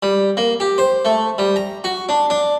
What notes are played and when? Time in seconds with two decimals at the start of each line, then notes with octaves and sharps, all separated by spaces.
0.03 G3
0.37 A#3
0.60 G4
0.78 C5
1.05 A3
1.38 G3
1.56 A#5
1.84 F#4
2.09 D4
2.30 D4